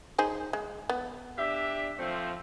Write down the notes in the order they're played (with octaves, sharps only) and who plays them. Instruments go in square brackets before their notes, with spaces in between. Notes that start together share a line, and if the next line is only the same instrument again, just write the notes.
[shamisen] D#4 G#4 C5
G#3
B3
[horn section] D4 G4 E5
F3 A3 C4